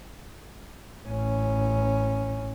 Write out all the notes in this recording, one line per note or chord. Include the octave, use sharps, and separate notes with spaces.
A1 C#4